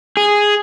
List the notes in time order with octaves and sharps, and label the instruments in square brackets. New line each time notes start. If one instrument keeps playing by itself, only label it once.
[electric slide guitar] G#4